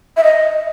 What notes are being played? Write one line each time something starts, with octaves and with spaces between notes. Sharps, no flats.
E5
D#5